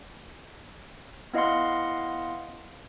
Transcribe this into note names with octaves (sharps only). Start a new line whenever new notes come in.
B3 E4 D#5 F5 F#5 C6